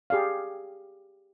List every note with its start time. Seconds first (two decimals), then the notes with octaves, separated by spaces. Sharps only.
0.10 G4 G#4 D5 F5